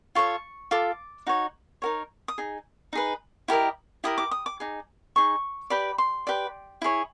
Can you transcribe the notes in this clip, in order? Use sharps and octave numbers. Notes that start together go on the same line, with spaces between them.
F4 A4 C#5 C#6
F4 A4 D6
D#4 F#4 C#5
D#4 F#4 A#4 C#5
D#6
D#4 G#4
D#4 G#4 B4
E4 G4 A#4 D#5
E4 G4 A#4 D#6
D6
D#6
D6
D#4 G#4
D#4 G#4 C#6
G4 B4 D5 B5
C6
G4 B4 D5
E4 G#4 C#5